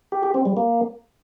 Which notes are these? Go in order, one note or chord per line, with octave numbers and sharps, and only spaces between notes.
G4
G4
C4
G3
A#3